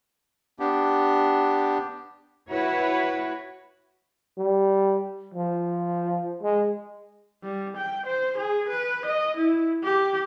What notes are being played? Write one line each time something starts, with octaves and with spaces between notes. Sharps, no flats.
B3 D4 G4
E4 F#4 B4 C#5
G3
F3
G#3
G3
G5
C5
G#4
B4
D#5
E4
G4